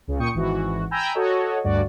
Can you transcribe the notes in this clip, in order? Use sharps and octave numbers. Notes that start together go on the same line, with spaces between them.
C#2 C#3
A#2 G5 C#6 D#6 C#7
G#1 E3 F#4
G5 G#5 A#5 B5 E6 G6
F#4 A4 C#5 D#5
D2 G2 F#4 D5